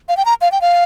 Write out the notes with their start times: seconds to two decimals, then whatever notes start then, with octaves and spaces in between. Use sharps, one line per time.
0.09 F5
0.17 G5
0.25 A#5
0.41 F5
0.52 G5
0.61 F5